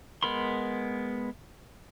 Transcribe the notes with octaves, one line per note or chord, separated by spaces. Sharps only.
G#3 B3 A#4 B5 C6